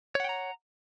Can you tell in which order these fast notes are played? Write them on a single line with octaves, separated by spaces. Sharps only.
C#5 F#5 G5 A#5